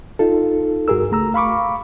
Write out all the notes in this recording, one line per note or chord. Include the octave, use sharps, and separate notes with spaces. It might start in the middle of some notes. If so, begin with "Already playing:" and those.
D#4 F4 A4
G2 F#4 G#4 A#4 E6
C#2 A3 A#5 E6
F5 B5 C#6 D6